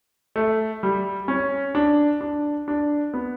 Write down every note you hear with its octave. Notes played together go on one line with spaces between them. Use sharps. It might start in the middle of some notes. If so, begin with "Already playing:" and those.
A3
G3
C#4
D4
D4
D4
B3